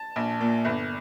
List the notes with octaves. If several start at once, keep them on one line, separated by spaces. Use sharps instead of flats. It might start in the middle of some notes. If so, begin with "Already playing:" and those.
Already playing: A5
A#1
A#2
G1